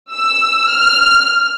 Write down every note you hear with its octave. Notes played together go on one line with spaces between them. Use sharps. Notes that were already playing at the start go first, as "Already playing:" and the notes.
E6
F6